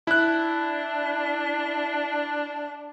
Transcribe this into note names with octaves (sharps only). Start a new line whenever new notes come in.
D4 E4 F#6